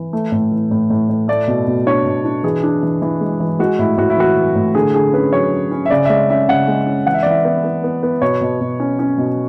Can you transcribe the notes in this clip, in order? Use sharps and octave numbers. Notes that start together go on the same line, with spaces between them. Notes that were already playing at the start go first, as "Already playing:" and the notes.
Already playing: E3
A3
A2
E3
A2
A2
A2
A3 D5
B2
B2
D4 C#5
B2
D4
E3 G#4
D4
E3
E3
G#3
E3
G#3 F#4
A2 E4
A2 F#4
E4
E3 F#4
E3
A2
D3 G#4
D3 G#4
C#4 B4
F#3 C#5
C#4
C#4
E5
C#3 D5
E5
G#3 D5
C#4 E5
C#3 F#5
G#3
C#4
E3 F#5
E5
D5
E3 E5
B3
B3
B3
B3
B2 C#5
B2
B2
C#4
C#4
B2